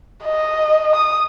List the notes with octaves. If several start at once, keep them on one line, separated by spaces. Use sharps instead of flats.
D#5
D#6